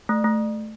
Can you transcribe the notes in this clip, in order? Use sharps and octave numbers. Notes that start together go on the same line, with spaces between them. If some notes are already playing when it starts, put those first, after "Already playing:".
A3
A3